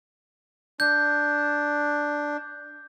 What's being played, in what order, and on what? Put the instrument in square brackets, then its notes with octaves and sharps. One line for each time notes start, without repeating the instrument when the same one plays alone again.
[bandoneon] D4 [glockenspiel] G6